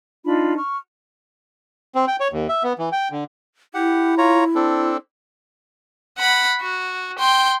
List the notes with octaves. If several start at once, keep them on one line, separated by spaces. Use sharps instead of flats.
D4 D#4 F4 B5
C#6 F6
C4
G5
C#5
D#2
E5
B3
E3
G5
D3
E4 G4 F#5
F4 C#5 A#5
C4 D4 A4
F#5 B5
F#4
G5 C6